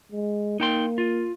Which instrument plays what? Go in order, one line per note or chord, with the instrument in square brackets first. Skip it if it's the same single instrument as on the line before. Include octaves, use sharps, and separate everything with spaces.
[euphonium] G#3
[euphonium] A#3 [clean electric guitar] D#4 G5 C6
[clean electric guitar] F4